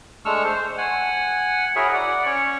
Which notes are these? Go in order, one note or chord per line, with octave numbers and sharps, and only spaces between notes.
G#3 A3 D4 C#6 E6 F6
C5
F#5 G#5
E4 F#4 G#4 A#4 C#5 E5
D5 F#5
C#4 C#5 C#6